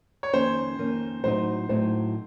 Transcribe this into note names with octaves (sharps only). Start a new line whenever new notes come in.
C#5
F2 D#3 A#3 C#4 C5
F2 D#3 A#3 C#4
A2 F#3 C4 D#4 C5
A2 F#3 C4 D#4 C5